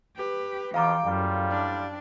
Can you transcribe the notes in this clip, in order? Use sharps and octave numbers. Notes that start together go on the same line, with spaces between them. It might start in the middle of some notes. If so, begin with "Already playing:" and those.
G4 B4
F2 B2 E3 F4 F5 G5 A#5 D6
F#2 A2 G3 F4
D4